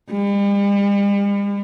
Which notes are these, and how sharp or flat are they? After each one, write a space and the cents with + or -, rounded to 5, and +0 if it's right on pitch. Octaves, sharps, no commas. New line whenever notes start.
G3 +45